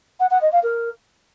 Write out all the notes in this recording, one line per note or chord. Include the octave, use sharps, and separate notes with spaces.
F#5
F#5
D#5
F5
A#4